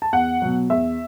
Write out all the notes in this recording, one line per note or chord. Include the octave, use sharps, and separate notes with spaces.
A5
E2 F#5
B2 F#3
E2 E5